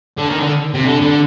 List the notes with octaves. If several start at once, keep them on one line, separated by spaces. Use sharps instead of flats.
D3
D#3
D3
C3
D3
D3